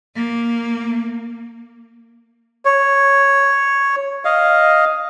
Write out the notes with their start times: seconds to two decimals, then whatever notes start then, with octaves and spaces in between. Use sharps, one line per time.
0.16 A#3
2.65 C#5
4.25 D#5 F5